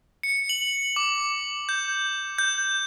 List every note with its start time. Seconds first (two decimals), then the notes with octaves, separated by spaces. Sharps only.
0.23 C#7
0.49 F#7
0.96 D6
1.69 G6
2.38 G6